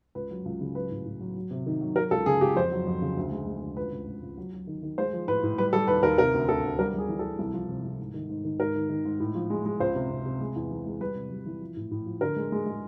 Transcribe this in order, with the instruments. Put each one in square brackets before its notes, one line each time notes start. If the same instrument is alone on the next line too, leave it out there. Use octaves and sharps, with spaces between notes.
[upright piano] C#2 B4
F#3
C#2
C#3
F#3 B4
A2
A2
F#3
F#3
C3
D#3
F#3
F#3 A#4
C#2 A4
C#3 G#4
C#2 G4
F2 C5
F#3
F2
C#3
D2
G#3
G#3
D2
C#2 B4
C#2
C#2
C#2
F#3
F#3
D#3
D#3
G#3 C5
F3
A2 B4
A2
G3 B4
G3 A4
D#2 B4
D#2 A#4
C3 A#4
D2
D2 A4
D2
G3 A#4
G3 G#4
E3
E3 A4
C2
F3
C3
C2
G#2
D#3
G#2
D#3
G#2 A#4
D#3
D#3
G#2
A2
F3
G#3
G#3
C#2 C5
C3
C3
C3
G#3
E2
E3
G#3
G3 B4
C3
G3
E3
F3
A2
A2
F3
D3 A#4
G#3
G#3
G#3